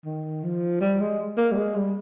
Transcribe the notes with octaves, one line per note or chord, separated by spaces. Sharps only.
D#3
F3
G3
G#3
A#3
G3
G#3
G3